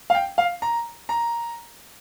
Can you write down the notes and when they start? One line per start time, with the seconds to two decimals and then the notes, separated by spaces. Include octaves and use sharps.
0.10 F5
0.15 G5
0.38 F5
0.62 A#5
1.09 A#5